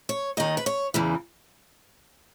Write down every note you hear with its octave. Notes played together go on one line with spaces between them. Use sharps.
C#5
D#2 D#3 D#5
B4
C#5
E2 C#3 E3